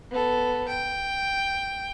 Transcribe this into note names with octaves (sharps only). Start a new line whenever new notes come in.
B3 A4
G5